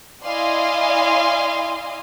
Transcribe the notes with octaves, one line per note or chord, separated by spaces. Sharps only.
E4 D5 D#5 F5 G#5 C6